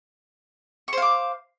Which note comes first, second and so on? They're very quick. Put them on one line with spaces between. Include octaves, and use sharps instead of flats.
C#6 C5 F5 D6